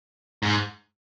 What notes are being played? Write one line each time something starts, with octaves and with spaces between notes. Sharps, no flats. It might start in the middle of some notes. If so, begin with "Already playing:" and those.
G#2